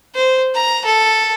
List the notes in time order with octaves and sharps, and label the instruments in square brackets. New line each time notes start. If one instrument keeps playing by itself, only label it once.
[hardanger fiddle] C5
A#5
A4